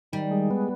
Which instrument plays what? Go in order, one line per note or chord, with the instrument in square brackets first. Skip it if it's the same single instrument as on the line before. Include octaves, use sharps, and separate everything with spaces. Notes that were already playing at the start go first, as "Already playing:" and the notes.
[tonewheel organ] D#3 [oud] G3
[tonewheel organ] G#3
B3